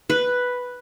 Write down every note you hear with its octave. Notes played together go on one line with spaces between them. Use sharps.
B4